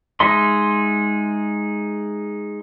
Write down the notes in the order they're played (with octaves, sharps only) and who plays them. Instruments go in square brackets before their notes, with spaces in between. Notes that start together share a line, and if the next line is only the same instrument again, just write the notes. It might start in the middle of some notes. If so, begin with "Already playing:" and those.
[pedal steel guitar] G#3 D#4 E5 C6